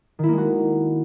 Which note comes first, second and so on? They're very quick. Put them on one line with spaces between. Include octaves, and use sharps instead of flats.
D#3 E4 A#3 G#3 F#4